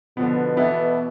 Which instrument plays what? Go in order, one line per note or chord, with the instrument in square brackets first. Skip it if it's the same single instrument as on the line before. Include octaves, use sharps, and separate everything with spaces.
[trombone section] B2 [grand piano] D3 F3 B3
[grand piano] E3 B3 E4 A4